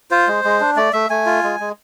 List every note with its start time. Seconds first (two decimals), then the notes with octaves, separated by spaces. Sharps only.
0.11 F4 C5
0.28 G#3
0.44 G#3
0.61 D4
0.76 A3 D5
0.93 A3 E5
1.10 A3 G#5
1.26 F4
1.43 G#3
1.60 G#3